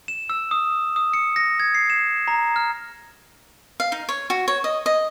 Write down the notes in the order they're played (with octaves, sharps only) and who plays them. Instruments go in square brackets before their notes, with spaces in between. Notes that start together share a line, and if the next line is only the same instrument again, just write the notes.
[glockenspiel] E7
E6
D#6
D#6
C#7
A#6
G#6
C7
E7
A#5
F6
[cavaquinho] F5
D#4
C#5
F#4
C#5
D#5
D#5